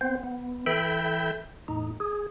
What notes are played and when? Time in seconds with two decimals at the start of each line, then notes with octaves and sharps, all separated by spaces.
0.01 B3 C4 C5
0.23 B3
0.66 E3 A4 E5 G5 B5 G6
1.68 E2 A2 D#4
2.00 G#4